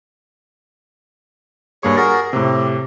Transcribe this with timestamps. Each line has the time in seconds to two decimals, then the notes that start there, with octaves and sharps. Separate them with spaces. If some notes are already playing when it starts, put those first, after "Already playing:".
1.83 G2 A#3 G#4 C#5 C#6
1.97 F#4 G#4 A#4 A6 A#6
2.33 A2 C3 C4 G4